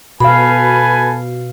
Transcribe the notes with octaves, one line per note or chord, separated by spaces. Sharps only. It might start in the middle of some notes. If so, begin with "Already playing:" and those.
B2 A4 B4 F5 G#5 B5